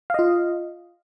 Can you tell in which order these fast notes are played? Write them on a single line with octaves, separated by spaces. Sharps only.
F5 D#5 F4